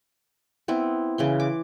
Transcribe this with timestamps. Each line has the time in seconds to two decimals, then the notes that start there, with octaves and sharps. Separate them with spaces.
0.68 B3 C4 E4
1.18 C#3 E3 C6
1.40 D6